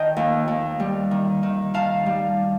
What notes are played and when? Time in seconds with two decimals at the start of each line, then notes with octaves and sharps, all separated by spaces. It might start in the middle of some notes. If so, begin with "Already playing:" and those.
Already playing: D#3 D#5 G5 A5
0.17 D#2
0.47 D#2
0.80 G3
1.11 D#3
1.43 D#3
1.74 D#3 F5 A5
2.06 G3